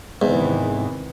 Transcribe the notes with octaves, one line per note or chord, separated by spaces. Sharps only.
E2 G#2 C3 D#3 E3